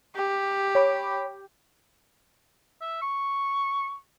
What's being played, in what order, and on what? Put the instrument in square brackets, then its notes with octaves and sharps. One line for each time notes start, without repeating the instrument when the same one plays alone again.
[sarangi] G4
[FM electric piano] C#5 B5 D6
[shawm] E5
C#6